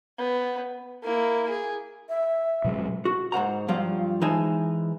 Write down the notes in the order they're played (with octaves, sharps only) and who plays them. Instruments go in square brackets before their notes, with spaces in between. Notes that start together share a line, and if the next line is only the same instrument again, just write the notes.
[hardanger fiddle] B3
[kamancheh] A#3 E4
G#4
[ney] E5
[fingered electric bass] B2 F#3 G#3
[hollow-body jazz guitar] F#4
G#2 C5 F#5 A#5
G2 F3 F#3 F4
E3 G#3 D#4 C5 G#5 A5